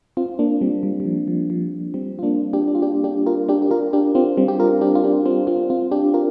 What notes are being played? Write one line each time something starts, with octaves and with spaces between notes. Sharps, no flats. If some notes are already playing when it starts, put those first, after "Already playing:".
C4 F4
A#3 D4
G3 C4
G3
G3
F3
F3
F3
G3 C4
F4
A#3 D4
D4 G4
D4
F4
D4 G4
D4 G4
F4 A#4
D4 G4
G4
F4 A#4
D4 G4
C4 F4
G3 C4
G4
F4 A#4
D4 G4
F4
D4 G4
C4 F4
C4 F4
C4 F4
D4 G4
F4 A#4